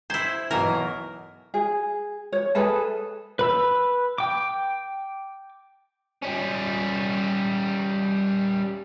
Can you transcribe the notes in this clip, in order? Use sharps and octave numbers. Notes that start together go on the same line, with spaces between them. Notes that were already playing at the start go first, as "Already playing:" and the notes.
E4 C5 G6 G#6
B1 B2 E3 A#4
G#4
C#5
G#4 A4 B4 A5
B4 B5 E6
G5 D6
G3 C#4